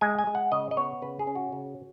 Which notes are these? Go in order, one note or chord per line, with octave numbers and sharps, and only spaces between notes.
G#3 G#5
G#5
G#3
F#5
C#3 D#5
D#5
B3 C#5
C#3 B4
G#4
C#4
F#4
C#3